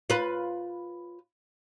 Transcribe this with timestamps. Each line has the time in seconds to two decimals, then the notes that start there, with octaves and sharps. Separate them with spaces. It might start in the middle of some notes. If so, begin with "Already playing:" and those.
0.10 F4 B4